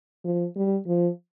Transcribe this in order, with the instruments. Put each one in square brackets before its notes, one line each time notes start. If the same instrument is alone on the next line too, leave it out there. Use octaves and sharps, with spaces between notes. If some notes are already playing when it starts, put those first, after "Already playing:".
[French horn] F3
G3
F3